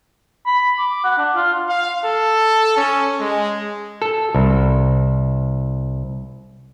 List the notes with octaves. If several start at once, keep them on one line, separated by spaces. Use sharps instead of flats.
B5
D6
F#5
D4
F4
F5
A4
C#4
G#3
A4
C2